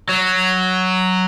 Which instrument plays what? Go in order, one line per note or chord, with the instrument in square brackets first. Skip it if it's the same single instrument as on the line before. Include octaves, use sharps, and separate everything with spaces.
[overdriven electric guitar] F#3